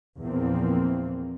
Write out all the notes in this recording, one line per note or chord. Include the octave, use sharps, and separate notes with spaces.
E2 A#2 E3 F3 A#3 C4